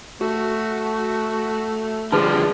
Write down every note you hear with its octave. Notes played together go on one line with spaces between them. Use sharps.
A3 F#4
D3 F3 G3 D4 G#4 B4 A5